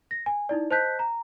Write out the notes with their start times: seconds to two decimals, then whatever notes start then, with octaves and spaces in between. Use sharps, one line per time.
0.11 A#6
0.26 G#5
0.49 D#4 E4 D5
0.71 C5 D#5 A5 F#6 G6 B6
0.99 A#5